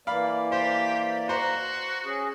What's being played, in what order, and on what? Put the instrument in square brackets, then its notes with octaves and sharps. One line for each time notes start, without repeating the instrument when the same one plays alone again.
[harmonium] E3 A#3 D5 [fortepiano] F5 B5
[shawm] G4 [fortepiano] C5
[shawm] F#4 [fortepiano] C5 A#5
[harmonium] C#4 G#4